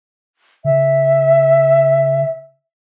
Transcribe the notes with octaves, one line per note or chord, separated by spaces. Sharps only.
C#3 E5